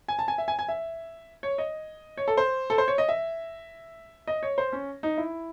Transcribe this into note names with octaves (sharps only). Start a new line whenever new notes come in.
G#5
A5
G#5
E5
G#5
G#5
E5
C#5
D#5
C#5
A4
C5
A4
C5
C#5
D#5
E5
D#5
C#5
C5
C#4
D#4
E4